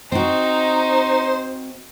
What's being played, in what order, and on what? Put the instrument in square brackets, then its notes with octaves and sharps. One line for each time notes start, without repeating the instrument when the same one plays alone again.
[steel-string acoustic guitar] C4 F#4 [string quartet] D#4 [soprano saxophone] C5